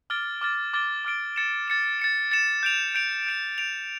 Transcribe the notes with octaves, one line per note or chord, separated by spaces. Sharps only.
D6 F6 A6 D7 G7
D6 F6 A6 D7 G7
D6 F6 A6 D7 G7
D6 F6 A6 D7 G7
A6 C#7 E7
A6 C#7 E7
A6 C#7 E7
A6 C#7 E7
G6 D7 F7
G6 D7 F7
G6 D7 F7
G6 D7 F7